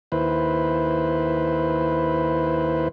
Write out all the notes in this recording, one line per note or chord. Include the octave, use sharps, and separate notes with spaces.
D#2 E4 B4 C5